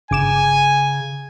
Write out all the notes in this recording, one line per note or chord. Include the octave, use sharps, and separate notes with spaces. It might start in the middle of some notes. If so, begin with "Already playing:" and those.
G1 C#3 G#5 D6 E7